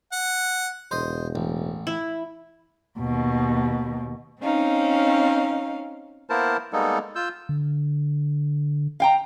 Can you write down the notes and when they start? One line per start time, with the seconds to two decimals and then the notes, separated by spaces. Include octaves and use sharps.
0.12 F#5
0.91 E1 C5 D#5
1.35 A1
1.87 E4
2.99 D#2 B2
4.41 C4 C#4 D#4 F5
6.30 A#3 B3 E4 A#4 C5 A5
6.73 G3 G#3 A#3 B3 D#4 A4
7.16 F4 E6 G6
7.49 D3
9.00 F5 G5 A#5